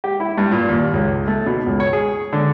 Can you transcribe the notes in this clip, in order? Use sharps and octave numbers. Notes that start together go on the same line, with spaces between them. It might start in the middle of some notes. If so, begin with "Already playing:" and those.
G4
E4
G2
A#2
D#2
C#2
A3
B2
C#2
C#5
G#4
D3